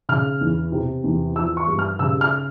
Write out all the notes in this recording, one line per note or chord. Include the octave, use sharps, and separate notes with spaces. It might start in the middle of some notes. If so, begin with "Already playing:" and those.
C#3 F6
E2
C3
E2
F3 E6
C#6
G2
F6
C#3 E6
F6